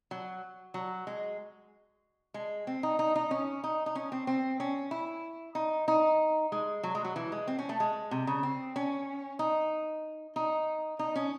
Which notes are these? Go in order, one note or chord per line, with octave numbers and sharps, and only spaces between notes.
F#3
F#3
G#3
G#3
C4
D#4
D#4
D#4
C#4
D#4
D#4
C#4
C4
C4
C#4
E4
D#4
D#4
G#3
F#3
G#3
F#3
E3
G#3
C4
C#4
A3
G#3
C3
C#3
C4
C#4
D#4
D#4
D#4
C#4